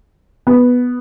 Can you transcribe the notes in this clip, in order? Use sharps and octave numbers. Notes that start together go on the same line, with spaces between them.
B3